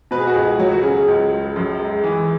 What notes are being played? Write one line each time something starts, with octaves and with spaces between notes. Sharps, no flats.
B2 B4
G#4
F#4
C#2 G#4
F#3
F#4
C#3 G#4
C#2
G#3
F#2
G#3
E3